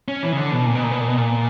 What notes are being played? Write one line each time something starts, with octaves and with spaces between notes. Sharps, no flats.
C#4
E3
C#3
D3
B2
A#2
B2
A#2
B2
A#2
B2
A#2